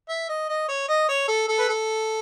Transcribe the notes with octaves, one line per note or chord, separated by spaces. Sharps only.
E5
D#5
D#5
C#5
D#5
C#5
A4
A4
B4
A4